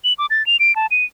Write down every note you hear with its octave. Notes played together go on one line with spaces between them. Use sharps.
F#7
D6
A6
F7
D7
A5
D#7